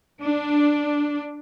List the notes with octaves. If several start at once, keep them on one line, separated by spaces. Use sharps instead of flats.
D4